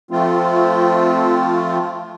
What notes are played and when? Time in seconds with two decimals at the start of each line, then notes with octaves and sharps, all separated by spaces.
0.11 F3 A3 C4 F4